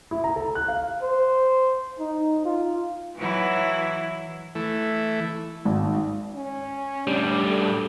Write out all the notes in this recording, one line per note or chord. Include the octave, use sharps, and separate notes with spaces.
E4
A#5
A4
F#6
F5
C5
D#4
F4
E3 F#3 E4
E3 A3
G#1
C#4
A2 G3 D4
A4